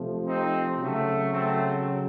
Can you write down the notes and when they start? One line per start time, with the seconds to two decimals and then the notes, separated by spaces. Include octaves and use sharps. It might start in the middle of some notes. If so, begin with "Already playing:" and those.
Already playing: C3 F3 A3
0.26 C4 D#4
0.80 C#3 F#3 A3
1.33 A3 C4